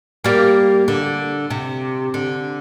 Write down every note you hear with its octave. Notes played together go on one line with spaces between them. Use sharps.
G3 A#3
D3
C3
D3